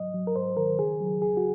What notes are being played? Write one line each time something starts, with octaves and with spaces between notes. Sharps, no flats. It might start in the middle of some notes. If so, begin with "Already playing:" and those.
Already playing: G#2 F#3 D#5
F#3
A#4
G#2 C5
D#3 A#4
C#3 G#4
F#3
F2 G#4
F#4